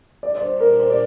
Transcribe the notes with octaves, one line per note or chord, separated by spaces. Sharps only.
A#2 G3 D4 G4 D5
D5
C5
A#4
C5
D5